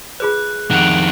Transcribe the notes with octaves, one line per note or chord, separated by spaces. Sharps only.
F4 G#4 B4 F#6
F2 D#3 F#5 D7 F7 F#7